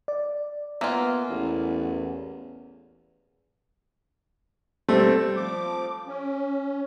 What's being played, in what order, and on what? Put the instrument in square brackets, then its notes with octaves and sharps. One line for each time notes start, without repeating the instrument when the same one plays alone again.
[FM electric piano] D5
[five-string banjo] A#3 F4 [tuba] B3 [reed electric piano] E5 F#5 G#5
[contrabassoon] A1 [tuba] E2
[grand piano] G3 C4 [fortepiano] A3
[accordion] F3 D6
C#4